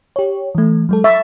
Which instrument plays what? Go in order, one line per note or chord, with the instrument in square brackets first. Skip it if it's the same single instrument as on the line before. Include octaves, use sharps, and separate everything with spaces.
[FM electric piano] G4 C#5
E3 A3
F#3 G#3 A4
[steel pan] E5 [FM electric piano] C#6 A6